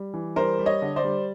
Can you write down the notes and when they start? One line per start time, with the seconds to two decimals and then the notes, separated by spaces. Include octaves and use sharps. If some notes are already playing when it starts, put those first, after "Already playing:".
Already playing: G3
0.14 E3
0.36 G3 A#4 C5
0.59 G3
0.66 C#5 D#5
0.82 D3
0.96 C5 D5
1.04 G3